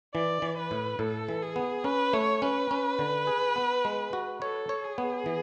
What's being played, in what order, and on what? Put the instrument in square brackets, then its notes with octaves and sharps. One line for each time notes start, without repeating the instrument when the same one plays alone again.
[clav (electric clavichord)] E3 [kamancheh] D5
[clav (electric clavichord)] E3
[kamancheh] B4
[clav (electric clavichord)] A2
[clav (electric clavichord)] A2 [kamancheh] A4
[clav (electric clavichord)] E3
[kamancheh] G#4
[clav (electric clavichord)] B3
[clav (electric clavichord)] C#4 [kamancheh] B4
[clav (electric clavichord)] A3 [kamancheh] C#5
[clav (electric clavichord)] C#4 [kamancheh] B4
[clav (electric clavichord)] C#4
D3
G#4
B3
G#3
F#4
[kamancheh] A4 [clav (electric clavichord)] C#5
[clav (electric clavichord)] C#5
[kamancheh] G#4
[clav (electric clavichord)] B3
E3